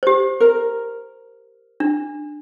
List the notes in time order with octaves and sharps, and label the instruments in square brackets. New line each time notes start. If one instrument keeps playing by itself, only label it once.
[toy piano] G4 C5
[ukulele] A#4
[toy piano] D4